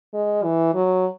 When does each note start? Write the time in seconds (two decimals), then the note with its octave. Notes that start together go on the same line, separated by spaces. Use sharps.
0.14 G#3
0.44 E3
0.75 F#3